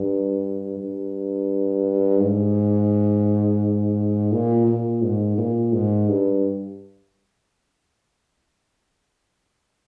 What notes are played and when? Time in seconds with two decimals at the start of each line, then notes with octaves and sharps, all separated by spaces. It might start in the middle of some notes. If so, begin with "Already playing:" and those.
Already playing: G2
0.79 G2
2.20 G#2
4.32 A#2
4.67 A#2
5.02 G#2
5.38 A#2
5.73 G#2
6.08 G2